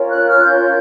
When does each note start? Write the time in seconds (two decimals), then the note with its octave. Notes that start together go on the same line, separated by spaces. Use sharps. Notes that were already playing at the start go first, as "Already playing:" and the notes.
Already playing: C#4 F4 A#4 C#5
0.10 F#6
0.27 F6
0.38 F#6
0.44 G6